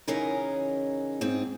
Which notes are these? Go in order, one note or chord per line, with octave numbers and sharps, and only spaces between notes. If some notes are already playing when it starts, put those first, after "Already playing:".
C#3 E3 C#4 D#4 G#4 A#4
G#2 C4 G#4